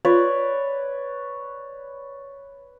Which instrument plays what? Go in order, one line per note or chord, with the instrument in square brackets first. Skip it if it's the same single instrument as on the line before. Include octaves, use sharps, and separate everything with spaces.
[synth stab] F4 [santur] B4 C#5 D5